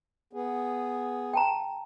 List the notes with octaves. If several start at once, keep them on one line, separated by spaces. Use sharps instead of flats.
B3 G#4
G5 A5 A#5